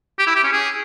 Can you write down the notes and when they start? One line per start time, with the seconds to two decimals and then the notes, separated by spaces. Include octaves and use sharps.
0.18 G4
0.27 E4
0.35 G4
0.44 C#4
0.52 G#4